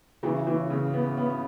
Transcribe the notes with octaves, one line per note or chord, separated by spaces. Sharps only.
C#3 E3
E3
C#3
B3
B3